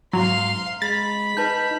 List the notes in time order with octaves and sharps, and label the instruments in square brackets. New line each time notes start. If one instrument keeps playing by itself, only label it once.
[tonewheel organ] G#2 [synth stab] F#3 [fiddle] F5 C6 [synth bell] A#5 F7
[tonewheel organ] G#3 [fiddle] B5 [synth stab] A6
[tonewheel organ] D#4 [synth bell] B4 A5 G6